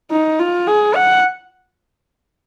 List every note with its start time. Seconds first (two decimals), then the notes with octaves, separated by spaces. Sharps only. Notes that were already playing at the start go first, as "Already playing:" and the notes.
0.11 D#4
0.39 F4
0.67 G#4
0.95 F#5